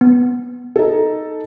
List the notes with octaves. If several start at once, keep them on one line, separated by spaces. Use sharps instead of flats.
B3
D#4 A4